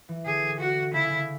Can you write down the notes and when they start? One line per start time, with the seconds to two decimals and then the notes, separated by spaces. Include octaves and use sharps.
0.09 E3
0.26 D3 G#4
0.60 F#4
0.93 C#3 E4
1.10 C#3